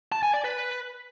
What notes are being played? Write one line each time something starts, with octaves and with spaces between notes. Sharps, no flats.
A5
G#5
D5
B4